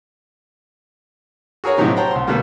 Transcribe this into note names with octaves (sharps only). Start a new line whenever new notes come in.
F#4 G#4 A#4 C#5 F#5
A2 C3 F3 F#3 D#4 G4
C5 C#5 F#5 G5 A5 A#5
C2 C6
B2 D3 G3 A3 A#3